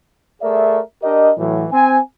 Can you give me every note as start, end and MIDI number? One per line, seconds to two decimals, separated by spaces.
0.42 0.80 57
0.42 0.80 68
0.42 0.80 70
0.42 0.80 74
0.42 0.80 76
1.03 1.31 62
1.03 1.31 67
1.03 1.31 70
1.03 1.31 75
1.38 1.65 45
1.38 1.65 52
1.38 1.65 54
1.72 1.99 60
1.72 1.99 80